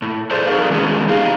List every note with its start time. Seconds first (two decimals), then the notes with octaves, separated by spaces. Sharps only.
0.02 A2
0.31 G#4 A4 C5 D5
0.47 D#4 F#4 G#4 A#4 D5 F5
0.70 D#3 G#3 B3 C#4 F#4 G#4
1.08 D#4 G4 G#4 F5